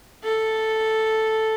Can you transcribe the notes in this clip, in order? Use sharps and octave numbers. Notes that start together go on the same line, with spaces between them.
A4